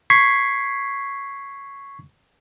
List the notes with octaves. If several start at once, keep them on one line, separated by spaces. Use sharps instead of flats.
C#6 G#6 B6 C7